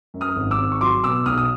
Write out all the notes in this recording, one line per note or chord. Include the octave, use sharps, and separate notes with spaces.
F#2
D#6 F6
G#1
D6 E6
G#1
C#6
F#3 C6 D6
B2 D6 E6
B1 D#6 F6
D#6